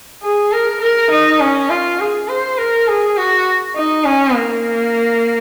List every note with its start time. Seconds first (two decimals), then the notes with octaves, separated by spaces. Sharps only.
0.23 G#4
0.52 A#4
0.81 A#4
1.11 D#4
1.40 C#4
1.70 F4
2.00 G#4
2.28 C5
2.58 A#4
2.88 G#4
3.17 F#4
3.76 D#4
4.05 C#4
4.35 A#3